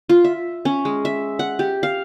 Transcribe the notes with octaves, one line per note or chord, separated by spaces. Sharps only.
F4
E5
C#4
G#3
E5
F#5
G4
F5